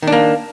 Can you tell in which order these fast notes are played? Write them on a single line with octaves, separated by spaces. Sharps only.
D#3 D4 A#3